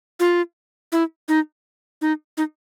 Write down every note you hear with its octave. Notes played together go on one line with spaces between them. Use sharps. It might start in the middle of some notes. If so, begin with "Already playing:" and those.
F4
E4
D#4
D#4
D#4